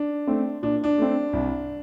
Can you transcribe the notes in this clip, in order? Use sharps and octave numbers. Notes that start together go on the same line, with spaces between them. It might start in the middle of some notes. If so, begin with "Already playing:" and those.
Already playing: D4
A3 C4
A#2 D4
D4
A3 C4
C2